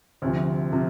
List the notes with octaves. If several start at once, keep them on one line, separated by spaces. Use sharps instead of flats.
D2 C3 F3
C3 F3